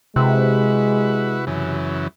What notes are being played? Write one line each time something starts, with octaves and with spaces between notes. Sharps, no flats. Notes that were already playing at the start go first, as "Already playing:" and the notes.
C3 G#3 E4 F#4 B4
F#2 C#3 E3